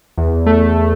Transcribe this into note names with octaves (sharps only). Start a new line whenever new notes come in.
E2
A3